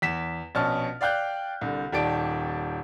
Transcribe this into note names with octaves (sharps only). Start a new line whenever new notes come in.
E2 B6 E7
A#1 B2 C#4 A5 F6
D5 F5 G5 F#6 G6
C2 D3
D#1 D#3 G4 D5 A5 D7